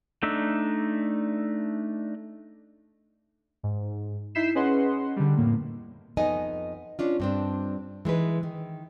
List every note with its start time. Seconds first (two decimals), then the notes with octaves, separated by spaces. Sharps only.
0.23 A3 D4 D#4 E5
3.63 G#2
4.35 D#4 E4 G6 B6 C7 E7
4.55 C#4 G#4 B4 D#5 F#5 C6
5.16 D3 G3
5.37 F2 A2 A#3
6.17 F2 B3 D#4 D#5 G#5
6.99 C#4 D4 F4
7.20 G2 C4 D4
8.05 E3 G#3 D#4 B4
8.43 D#3